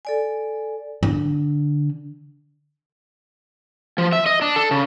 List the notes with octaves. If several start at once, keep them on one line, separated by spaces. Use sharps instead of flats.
A4 D5 G#5
D3
F3
E5
D#5
D4
A4
C#3